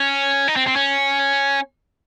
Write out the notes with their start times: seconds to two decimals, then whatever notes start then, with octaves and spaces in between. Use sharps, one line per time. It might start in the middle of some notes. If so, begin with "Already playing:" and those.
Already playing: C#4
0.48 D#4
0.56 C4
0.67 C4
0.76 C#4